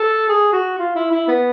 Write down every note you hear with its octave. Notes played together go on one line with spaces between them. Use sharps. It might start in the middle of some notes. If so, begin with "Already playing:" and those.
Already playing: A4
G#4
F#4
F4
E4
E4
B3